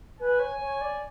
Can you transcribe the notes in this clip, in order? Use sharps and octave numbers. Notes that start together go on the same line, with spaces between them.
B4 G#5
C#5
C#5
D5